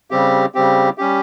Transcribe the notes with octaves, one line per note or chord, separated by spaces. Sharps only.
C#3 G3 C4 G4
C#3 G3 C4 G4
G3 C#4 G4